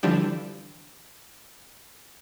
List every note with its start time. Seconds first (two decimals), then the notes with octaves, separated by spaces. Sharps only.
0.03 D3 E3 F3 G3 D4 G4